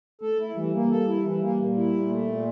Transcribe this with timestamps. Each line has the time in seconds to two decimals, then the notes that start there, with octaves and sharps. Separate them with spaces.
0.22 A3 A4
0.39 E4
0.56 E3 G3
0.74 A#3
0.90 A4
1.08 E4
1.24 E3
1.42 A#3
1.60 A#2
1.77 E4
1.93 A#2
2.10 A3
2.27 A#2